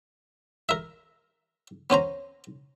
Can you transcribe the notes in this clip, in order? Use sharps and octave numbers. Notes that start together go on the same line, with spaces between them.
A#4 E5
B3 C#4 C5 A#5